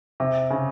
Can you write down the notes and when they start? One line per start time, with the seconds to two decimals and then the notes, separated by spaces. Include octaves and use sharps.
0.20 C3
0.50 C#3